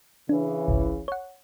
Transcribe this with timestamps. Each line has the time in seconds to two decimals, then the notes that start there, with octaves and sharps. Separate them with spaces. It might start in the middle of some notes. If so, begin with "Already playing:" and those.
0.29 C#3 E3 D4
0.68 G1 C2
1.08 C#5 F#5